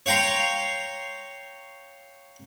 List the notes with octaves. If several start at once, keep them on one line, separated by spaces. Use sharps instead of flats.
C#5 F5 G5 A#5 C6